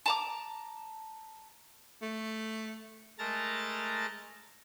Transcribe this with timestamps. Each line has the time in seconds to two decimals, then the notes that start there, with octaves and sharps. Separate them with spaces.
0.06 A5 A#5 D6
2.02 A3
3.19 G#3 A3 A#4 A5 A#5 A6